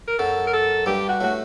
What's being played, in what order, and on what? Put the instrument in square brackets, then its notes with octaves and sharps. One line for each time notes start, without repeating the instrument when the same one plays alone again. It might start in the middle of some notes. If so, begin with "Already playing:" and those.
[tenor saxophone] A#4
[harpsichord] F#2 F#3 [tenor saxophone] A4
[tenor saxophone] A#4
A4
[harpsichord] G2 G3 [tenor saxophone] G4
[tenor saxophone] F#4
[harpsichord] A2 A3 [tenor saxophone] F#4